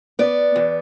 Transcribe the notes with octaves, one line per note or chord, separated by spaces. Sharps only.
B3 D5
E2